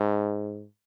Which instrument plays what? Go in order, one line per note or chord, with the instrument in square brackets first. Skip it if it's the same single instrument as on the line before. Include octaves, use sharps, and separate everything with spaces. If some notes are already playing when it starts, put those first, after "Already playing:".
Already playing: [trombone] G#2